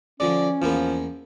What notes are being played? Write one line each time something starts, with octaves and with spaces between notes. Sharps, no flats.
D3 F3 G#3 C#4 D5
E2 F3 A#3 B3